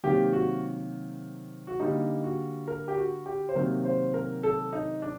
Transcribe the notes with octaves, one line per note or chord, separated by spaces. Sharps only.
C3 D#3 F#3 A#3 G4
F#4
F#4
D3 G3 A#3 D#4
F#4
A#4
G4
F#4
G4
C5
C3 D#3 F#3 A#3 A#4
C5
A#4
A4
D#4
D4